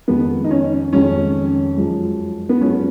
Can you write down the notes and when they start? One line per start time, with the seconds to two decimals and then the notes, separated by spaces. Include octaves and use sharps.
0.08 F2 D#3 G#3 B3
0.44 D#4
0.51 C#4
0.92 F2 D#3 G#3 C#4
1.76 F#2 F3 G#3
2.49 B3
2.61 F#2 F3 G#3 C#4